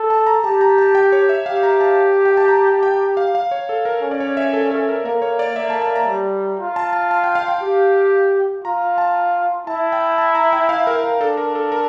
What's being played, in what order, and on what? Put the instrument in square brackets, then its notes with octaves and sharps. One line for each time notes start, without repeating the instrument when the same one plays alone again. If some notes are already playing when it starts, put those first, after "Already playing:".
Already playing: [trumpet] A4
[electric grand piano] A5
A#5
[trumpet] G4 [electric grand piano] A5
[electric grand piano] A#5
A5
G5
C#5
E5
[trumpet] G4 [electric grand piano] F5
[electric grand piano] A#5
A5
G5
A5
A#5
G5
F5
F5
C#5
A4
A#4
[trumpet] C#4
[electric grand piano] D5
C#5
E5
A4
A4
A#4
[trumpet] A#3 [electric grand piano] A#4
[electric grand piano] C#5
D5
[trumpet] A#3 [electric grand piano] E5
[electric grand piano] A5
A5
A#5
[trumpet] G3
F4
[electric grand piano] A5
A5
A5
G5
F5
G5
[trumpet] G4
[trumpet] F4 [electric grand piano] A#5
[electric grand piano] A5
[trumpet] E4 [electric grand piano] A5
[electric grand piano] G5
A5
A#5
G5
F5
A#4
A#4
[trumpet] D4 [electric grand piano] A4
[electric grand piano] A#4
A4
A#4